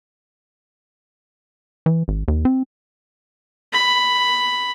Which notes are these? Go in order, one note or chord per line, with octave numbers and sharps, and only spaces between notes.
E3
G#1
D#2
C4
B5